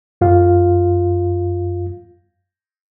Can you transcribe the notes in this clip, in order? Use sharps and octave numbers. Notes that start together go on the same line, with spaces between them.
F#2 F4 F5